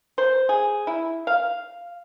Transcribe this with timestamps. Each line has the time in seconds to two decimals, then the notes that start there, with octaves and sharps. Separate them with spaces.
0.18 C5
0.49 G#4
0.87 E4
1.27 F5